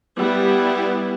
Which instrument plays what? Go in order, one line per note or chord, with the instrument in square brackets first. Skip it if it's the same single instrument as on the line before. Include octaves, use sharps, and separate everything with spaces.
[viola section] G3 B3 E4